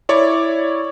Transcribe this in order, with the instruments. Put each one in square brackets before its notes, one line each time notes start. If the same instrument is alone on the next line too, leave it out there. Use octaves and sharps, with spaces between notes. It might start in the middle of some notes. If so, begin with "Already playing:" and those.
[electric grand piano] E4 C#5 D5 C#6